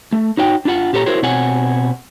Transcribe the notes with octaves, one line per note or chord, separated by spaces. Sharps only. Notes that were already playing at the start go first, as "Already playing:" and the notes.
A3
D#4 F#4 C#5 G5
D4 F4 F#5
A#2 G4 A4 C#5 A#5
E4 F#4 G#4 A#4 C5 C#5
B2 C4 C#5 F#5 G#5